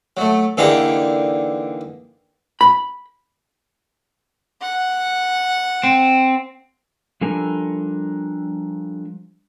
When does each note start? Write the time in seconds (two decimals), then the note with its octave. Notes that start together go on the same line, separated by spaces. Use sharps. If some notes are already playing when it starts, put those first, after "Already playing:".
0.17 F#3 A3
0.57 D3 E3 A#3 D#4 G4 G#4
2.61 B5
4.62 F#5
5.84 C4
7.21 F3 G3 D4 A4 A#4 G#5